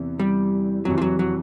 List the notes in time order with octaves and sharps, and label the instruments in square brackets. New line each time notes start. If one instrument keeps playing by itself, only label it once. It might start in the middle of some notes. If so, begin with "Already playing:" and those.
Already playing: [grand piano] E2 C3 E3
[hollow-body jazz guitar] G3
[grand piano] F2 C3 E3 [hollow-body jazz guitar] F#3
[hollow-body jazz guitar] F3
F#3
F#3